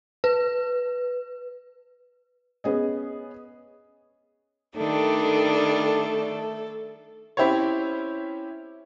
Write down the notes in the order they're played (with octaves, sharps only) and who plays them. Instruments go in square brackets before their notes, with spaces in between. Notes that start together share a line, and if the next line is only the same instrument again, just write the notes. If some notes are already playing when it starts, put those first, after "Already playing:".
[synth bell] B4
[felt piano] B3 C#4 G#4 D#5
[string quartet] D#3 G3 D4 [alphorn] A3 [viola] A4
[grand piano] C4 C#4 E4 G4 C5 C#5